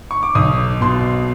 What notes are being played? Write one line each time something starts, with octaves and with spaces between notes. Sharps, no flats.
C#6
D6
B1 D#6
B2 C6